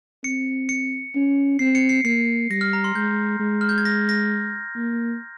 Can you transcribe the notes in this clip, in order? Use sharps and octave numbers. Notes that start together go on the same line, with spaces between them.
C4 C#7
C#7
C#4
C4 C7
C#7
C7
A#3 C7
G3 A#6
F6
A#5
C6
G#3 G6
G#3
F6
G6
G#6
A#6
A#6
A#3